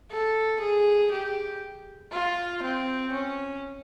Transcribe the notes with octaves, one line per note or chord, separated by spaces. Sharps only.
A4
G#4
G4
F4
C4
C#4